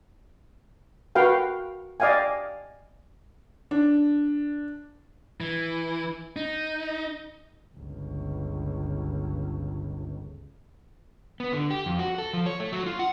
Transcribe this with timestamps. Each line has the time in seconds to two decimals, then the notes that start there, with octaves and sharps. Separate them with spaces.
1.15 F#4 A#4 B4 F5 G5
2.00 D5 D#5 F5 G5 G#5
3.71 D4
5.41 E3
6.36 D#4
7.77 G1 C#2
11.40 B3
11.53 D3
11.70 G4
11.86 F2
11.99 F#4
12.18 A4
12.33 F3
12.46 C#5
12.60 A3
12.72 F#3
12.86 F4
12.99 F#5